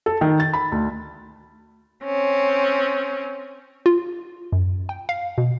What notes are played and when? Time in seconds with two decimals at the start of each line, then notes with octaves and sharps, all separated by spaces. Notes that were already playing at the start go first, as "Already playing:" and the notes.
0.06 A4
0.21 D#3
0.40 A6
0.53 B5
0.72 D2
2.04 C4 C#4
3.86 F4
4.52 F#2
4.89 G5
5.09 F5
5.38 B2